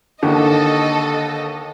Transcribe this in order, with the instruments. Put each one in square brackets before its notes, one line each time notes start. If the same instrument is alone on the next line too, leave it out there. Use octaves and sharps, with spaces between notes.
[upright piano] D#2 D3 [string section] A4 D#5